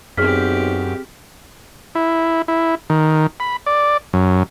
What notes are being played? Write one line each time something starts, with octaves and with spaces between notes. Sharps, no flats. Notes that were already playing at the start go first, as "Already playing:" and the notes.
B1 F#2 C4 G4 G#4 F6 B6
E4
E4
D#3
B5
D5
F#2